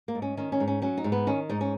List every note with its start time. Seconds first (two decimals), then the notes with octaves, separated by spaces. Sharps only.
0.08 A#3
0.15 G#2
0.22 C#4
0.37 D#3 C#4
0.52 C#4
0.60 G#2
0.67 C#4
0.82 F#3 C#4
0.97 D#4
1.04 G#2
1.12 B3
1.27 D#3 C#4
1.49 G#2 D#4
1.61 C#4